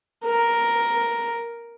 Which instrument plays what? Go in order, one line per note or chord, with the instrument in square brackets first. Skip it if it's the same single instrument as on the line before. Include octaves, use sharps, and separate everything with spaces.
[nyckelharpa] A#4